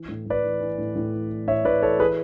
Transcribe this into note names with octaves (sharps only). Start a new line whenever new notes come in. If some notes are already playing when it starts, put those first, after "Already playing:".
Already playing: E3
A2
A2 B4 D5
E3
E3
A2
A2
E3
E3
A2 C#5 E5
A2 B4 D5
E3 A4 C#5
E3 G#4 B4